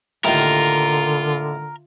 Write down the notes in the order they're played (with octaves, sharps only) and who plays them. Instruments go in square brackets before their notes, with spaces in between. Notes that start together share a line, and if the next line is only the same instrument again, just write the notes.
[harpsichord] D#2 A2 [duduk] D3 [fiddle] F4 [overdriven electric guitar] A#4